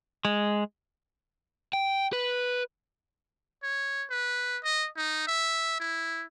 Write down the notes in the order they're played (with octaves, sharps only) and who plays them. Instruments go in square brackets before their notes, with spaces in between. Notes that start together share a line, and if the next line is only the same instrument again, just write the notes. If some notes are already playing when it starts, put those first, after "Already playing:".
[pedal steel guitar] G#3
[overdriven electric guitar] G5
B4
[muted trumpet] C#5
B4
D#5
D#4
E5
E4